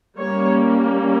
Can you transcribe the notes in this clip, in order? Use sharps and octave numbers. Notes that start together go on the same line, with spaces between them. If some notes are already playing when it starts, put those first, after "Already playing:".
G3 A#3 C#4 C#5